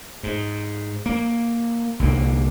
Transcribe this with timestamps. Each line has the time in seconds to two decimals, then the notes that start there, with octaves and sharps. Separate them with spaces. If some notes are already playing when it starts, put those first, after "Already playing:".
0.23 G#2
1.06 A#3
2.00 C2 D3 A#3